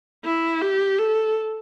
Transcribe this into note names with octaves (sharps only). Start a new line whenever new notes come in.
E4
G4
A4